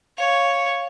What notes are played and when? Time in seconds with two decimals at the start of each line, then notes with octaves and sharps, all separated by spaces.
0.18 C#5 F5